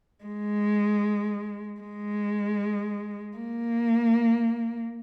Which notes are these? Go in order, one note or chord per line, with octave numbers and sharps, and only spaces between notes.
G#3
G#3
A#3